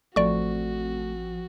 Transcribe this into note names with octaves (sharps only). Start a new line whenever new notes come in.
A1 F3 A3 C4 F#4 D5 C#6